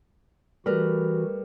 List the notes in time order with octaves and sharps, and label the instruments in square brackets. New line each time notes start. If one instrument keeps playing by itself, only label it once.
[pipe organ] E3 F#4 [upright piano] G3 A3 [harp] A#4 B4